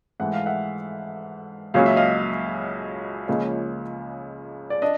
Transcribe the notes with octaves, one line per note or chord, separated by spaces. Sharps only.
G#2 E3 A3 F#5
F5
E5 F#5
C#2 C#3 F#3 A#3 C#4 F5
E5
D#5 F5
C#2 C#3 F3 A#3 C#4 D#5
D5
D4 D#5